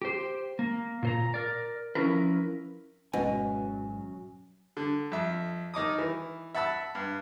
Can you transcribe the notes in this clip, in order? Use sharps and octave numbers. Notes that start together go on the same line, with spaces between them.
G4 C5
A#3
A#2 C5 A#5
A#4 D5
F3 G3 C#4 E4 A#4 B4
G#1 F#2 B2 F#3 G#3 C#4 G#5
D3
F2 E5
D#3 D#4 D6 D#6
E3
E5 F#5 A5 B5 E6
G2